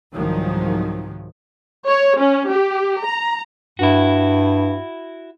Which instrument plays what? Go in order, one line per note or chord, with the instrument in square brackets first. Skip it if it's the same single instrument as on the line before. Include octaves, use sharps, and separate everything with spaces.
[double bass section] C2 G#2 D#3 F3 F#3
[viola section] C#5
C#4
G4
A#5
[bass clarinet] G2 [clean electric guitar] E4 F#4